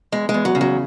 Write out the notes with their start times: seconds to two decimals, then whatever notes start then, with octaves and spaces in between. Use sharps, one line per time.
0.12 E2 G#3
0.29 G#3
0.34 E2
0.45 F#3
0.55 C#3
0.61 F#3